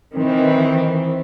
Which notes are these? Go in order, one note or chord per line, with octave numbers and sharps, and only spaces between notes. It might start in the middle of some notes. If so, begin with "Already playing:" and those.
D#3 E3 C4